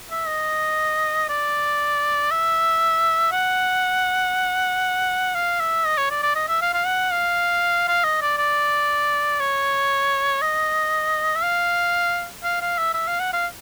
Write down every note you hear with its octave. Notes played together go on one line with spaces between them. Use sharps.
E5
D#5
D5
E5
F#5
F5
E5
D#5
C#5
D5
D5
D#5
E5
F5
F5
F#5
F5
F5
D#5
D5
D5
C#5
D#5
E5
F5
F5
F5
E5
E5
F5
F#5
F5